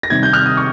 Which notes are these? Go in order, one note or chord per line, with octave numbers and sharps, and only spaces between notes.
A#6
C3 D#3 G3 G#6
G6
F6
D#6
C#6